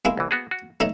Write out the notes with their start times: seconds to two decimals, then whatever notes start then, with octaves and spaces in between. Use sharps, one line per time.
0.05 G#3 A#3 E4
0.17 C2 E3
0.31 B3 F#4 G#4
0.51 F#4
0.80 B1 A3 D#4 D#5